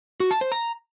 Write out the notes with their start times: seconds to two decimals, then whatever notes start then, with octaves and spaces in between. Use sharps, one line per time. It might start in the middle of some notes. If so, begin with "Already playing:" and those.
0.20 F#4
0.31 A5
0.41 C5
0.52 A#5